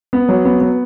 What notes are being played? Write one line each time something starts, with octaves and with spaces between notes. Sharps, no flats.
B3
F#3
B3
B3